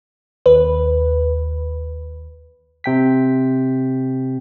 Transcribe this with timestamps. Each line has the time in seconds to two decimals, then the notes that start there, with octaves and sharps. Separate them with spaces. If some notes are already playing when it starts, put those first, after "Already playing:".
0.46 D#2 B4
2.84 C3 G5 B6